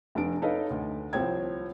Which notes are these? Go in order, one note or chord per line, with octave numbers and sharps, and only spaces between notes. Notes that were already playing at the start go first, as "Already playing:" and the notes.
F1 D4 D7
D#4 A4 B4 C#5 D#5 F5
D2
C2 F3 C4 C#5 G5 G#6